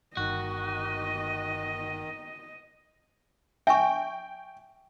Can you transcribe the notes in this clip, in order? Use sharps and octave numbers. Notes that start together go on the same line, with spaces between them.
G1 D#3 F#4 D#5
E5 G5 G#5 C#6